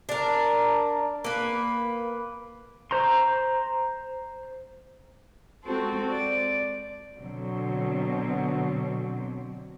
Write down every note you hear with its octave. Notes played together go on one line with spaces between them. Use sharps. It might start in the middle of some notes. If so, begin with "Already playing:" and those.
D4 A#4
A#3 B4
C5 A#5 C6
G#3 C4 F#4 A4 C5
D5
B2 D3 F#3 C4